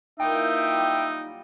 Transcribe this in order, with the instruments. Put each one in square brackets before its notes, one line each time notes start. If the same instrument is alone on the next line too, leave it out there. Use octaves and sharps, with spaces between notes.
[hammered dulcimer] A#2 E3 [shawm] D#4 [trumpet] E5 [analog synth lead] G5
[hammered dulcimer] F#3 G3